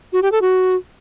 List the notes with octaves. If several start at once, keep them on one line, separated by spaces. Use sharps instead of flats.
F#4
G4
A4
F#4